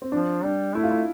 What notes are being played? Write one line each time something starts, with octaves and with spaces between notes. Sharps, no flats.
C4
F3 D4
G3 D4
A3 E4
F4
E4